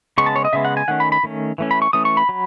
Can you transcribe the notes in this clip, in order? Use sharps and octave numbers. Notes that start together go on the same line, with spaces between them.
C#3 G#3 B3 C#6
A5
C#5
D#5
C#3 G#3 B3 E5
F#5
G#5
D#3 A3 C#4 F#5
B5
B5
D#3 A3 C#4
E3 A3 C#4
B5
C#6
E3 A3 C#4 D#6
C#6
B5
F#3